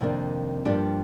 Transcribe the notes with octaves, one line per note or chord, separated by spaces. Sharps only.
F2 C3 D#3 A#3 D4
G2 F3 A#3 D4 G4